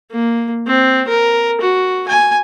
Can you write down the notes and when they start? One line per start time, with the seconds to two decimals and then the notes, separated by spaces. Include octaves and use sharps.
0.12 A#3
0.67 C4
1.08 A#4
1.60 F#4
2.08 G#5